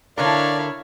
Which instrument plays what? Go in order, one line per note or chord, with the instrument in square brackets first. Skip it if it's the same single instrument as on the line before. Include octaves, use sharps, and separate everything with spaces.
[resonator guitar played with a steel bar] D3 D4 A#4 [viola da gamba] E4 C#5 [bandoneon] D5 [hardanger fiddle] F5